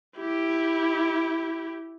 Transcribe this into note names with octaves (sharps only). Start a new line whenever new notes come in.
E4 G4